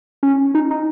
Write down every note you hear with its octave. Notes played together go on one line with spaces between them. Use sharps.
C#4
D#4
D#4